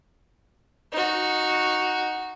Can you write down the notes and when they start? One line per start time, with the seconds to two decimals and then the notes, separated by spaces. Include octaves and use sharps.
0.92 D#4 F#4